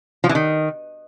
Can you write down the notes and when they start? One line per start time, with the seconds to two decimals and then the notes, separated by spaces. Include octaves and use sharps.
0.24 F3
0.29 E3
0.35 D#3